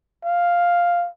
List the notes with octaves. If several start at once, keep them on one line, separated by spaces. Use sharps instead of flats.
F5